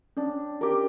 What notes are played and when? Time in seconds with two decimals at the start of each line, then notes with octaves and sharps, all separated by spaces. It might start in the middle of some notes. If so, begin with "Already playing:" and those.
0.17 C#4 D4
0.61 G4 A#4